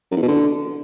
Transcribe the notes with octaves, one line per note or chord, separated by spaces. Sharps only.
F#2
E2
B2
D3